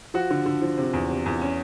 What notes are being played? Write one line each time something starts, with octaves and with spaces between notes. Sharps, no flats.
F3 F#4
D3
D3
F3
C3
E2
C3
E2
C#4